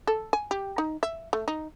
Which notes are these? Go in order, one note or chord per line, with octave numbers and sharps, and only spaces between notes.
A4
G#5
G4
D#4
E5
A3
D#4